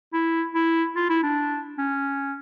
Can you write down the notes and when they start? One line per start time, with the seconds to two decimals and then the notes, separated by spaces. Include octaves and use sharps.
0.13 E4
0.55 E4
0.96 F4
1.10 E4
1.23 D4
1.78 C#4